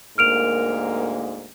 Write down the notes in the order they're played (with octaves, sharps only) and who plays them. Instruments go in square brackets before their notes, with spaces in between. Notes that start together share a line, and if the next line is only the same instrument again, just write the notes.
[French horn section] D2 G#2 A#3 [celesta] F6 D7 F7